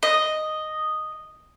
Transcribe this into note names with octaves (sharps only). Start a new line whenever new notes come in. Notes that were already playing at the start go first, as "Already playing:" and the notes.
D#5